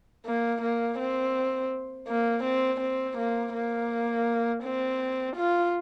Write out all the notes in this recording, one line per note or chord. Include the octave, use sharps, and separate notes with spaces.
A#3
A#3
C4
A#3
C4
C4
A#3
A#3
C4
F4